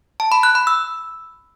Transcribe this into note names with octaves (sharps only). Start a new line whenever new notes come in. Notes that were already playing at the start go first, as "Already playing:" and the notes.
A5
B5
F#6
B5
E6